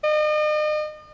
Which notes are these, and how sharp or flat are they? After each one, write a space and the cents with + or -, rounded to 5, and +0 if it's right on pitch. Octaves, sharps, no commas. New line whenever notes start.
D#5 -40